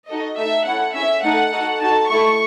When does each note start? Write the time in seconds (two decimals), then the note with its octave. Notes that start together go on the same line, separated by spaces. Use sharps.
0.08 D#4 F#4 A4 D#5
0.37 A3 D#4 A4 E5
0.66 C#4 E4 A4 F#5
0.94 C#4 E4 G#4 E5
1.23 A3 D#4 A4 F#5
1.52 D#4 F#4 A4
1.80 D#4 F#4 A4 A5
2.09 A3 E4 A4 C#6